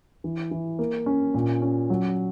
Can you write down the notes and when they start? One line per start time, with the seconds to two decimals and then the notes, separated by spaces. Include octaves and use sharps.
0.24 E3
0.51 E3
0.79 A#3
1.06 C#4
1.34 A#2
1.62 C#4
1.90 F#3